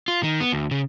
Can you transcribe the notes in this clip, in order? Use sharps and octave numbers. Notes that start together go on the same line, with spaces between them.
F4
D#3
B3
D2
C#3